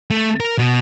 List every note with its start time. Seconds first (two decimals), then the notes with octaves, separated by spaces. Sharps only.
0.11 A3
0.40 A#4
0.58 B2